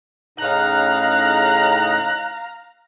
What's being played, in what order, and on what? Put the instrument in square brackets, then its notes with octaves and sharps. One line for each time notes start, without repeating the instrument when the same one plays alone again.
[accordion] A2 C#3 D#4 [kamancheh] F5 A#5 [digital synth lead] F#6